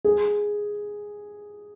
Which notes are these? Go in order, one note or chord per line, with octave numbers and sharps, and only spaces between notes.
G#4